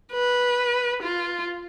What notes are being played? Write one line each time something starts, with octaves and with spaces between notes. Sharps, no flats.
B4
F4